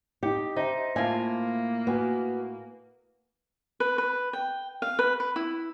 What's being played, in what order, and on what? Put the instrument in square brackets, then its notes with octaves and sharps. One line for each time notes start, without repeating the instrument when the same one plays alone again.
[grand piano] D#4 C#7 [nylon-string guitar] G4
[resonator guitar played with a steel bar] D#4 [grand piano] C5 E5
[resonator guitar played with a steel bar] A2 F4 [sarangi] A#3 [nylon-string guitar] G#5
[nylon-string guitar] B3 [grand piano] F#4 G#5
[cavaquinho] B4
B4
G5
F5
B4
B4
E4